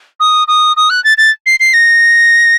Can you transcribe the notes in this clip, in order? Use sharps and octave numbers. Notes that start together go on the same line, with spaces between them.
D#6
D#6
D#6
F#6
A6
A6
C7
C7
A#6